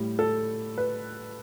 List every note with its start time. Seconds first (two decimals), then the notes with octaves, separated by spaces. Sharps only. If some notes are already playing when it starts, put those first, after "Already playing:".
Already playing: A2 G3
0.19 A4
0.78 B4